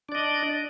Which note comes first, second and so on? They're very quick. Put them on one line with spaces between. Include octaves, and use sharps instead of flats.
D4 D5 D#5